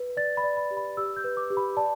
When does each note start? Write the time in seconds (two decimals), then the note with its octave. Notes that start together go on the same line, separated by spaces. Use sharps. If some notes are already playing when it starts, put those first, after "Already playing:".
Already playing: B4
0.17 D5 A6
0.37 B5
0.43 D5
0.57 B5
0.71 G4
0.77 B5
0.97 G4 E6
1.16 G6
1.24 B4
1.37 D6
1.50 G4
1.57 B5
1.77 D5 A5